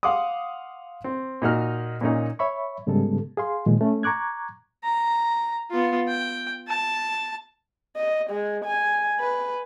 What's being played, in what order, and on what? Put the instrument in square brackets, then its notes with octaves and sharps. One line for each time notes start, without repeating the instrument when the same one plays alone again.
[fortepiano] F5 F#5 C6 D6 D#6
C4
A#2 D#4 F#4 F6
A#2 A#3 C#4 D#4
[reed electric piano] C#5 E5 B5 C#6
G#2 C#3 G3 G#3 B3 A4
G#4 F5 C6
A#2 D#3 F3 G#3
A3 C#4
A#5 C#6 D6 F#6 G#6
[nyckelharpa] A#5
B3 F4
G5
A5
[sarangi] D#5
G#3
G#5
B4